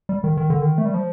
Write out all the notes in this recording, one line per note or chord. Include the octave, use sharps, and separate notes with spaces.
G3
D#3
D#3
D3
D#3
A3
G3
F3